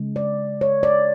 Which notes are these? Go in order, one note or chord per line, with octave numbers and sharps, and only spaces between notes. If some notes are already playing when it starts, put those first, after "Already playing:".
Already playing: C#3 G#3
D5
C#5
D5